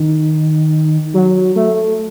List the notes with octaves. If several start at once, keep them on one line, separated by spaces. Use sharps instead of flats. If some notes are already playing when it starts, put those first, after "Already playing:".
Already playing: D#3
F#3
A3